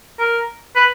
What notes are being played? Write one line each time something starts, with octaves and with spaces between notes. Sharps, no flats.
A#4
B4